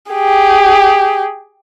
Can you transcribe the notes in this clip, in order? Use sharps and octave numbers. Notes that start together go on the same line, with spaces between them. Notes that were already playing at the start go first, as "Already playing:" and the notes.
G4 G#4